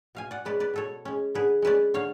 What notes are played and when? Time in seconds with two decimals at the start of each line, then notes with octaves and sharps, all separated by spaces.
0.15 B2 F5 G#5
0.31 D5 F#5
0.45 G#3 C#4 B4 D5
0.60 B4 D5
0.74 B2 A4 C#5
1.05 G#3 C#4
1.35 D3 G#4 B4
1.62 G#3 C#4 B4 D5
1.94 D3 C#5 F5